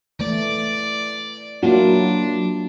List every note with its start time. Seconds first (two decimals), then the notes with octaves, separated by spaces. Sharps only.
0.19 E3 A3 D5
1.63 F#3 A#3 D4 E4 F4